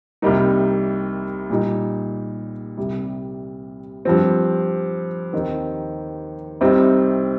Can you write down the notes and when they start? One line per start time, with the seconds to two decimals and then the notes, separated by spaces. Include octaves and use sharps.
0.22 C2 C3 G3 A#3 D#4
1.50 A#2 G3 D#4
2.77 C2 C3 G3
4.05 G2 F3 C4
5.33 D#2 D#3 C4 D#4
6.61 C2 C3 G3 C4 D#4